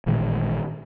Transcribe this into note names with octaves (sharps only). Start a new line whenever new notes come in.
A1 A#2 D#3 G#3